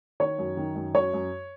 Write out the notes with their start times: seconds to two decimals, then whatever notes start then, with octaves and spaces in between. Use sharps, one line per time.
0.20 D#3 C#5
0.39 F#2
0.57 D#3
0.75 F#2
0.94 F#2 C#5
1.13 F#2